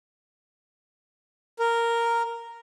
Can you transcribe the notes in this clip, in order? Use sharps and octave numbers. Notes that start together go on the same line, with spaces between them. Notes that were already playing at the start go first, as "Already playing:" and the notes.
A#4